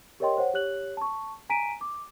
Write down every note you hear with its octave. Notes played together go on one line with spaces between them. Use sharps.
G4 A#4 C#5 D#5 G5 C6
C5 C#5 F#5
G4 C#5 F#6 F#7
A5 C#6
G#5 A#5 B6 D7 D#7
D6